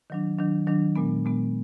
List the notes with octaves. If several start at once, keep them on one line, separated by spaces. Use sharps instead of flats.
D#3 F#3 D4
D#3 F#3 D4
D#3 F#3 D4
A#2 G#3 B3
A#2 G#3 B3